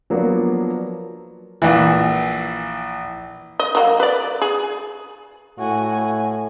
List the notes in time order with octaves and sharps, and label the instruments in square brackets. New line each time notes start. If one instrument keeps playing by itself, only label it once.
[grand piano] F3 F#3 A#3 B3 D4 B4
[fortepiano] A#1 E3
[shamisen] D#5
F#3 A#3
B4 D5
G#4
[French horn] A2 [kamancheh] F#4 G#5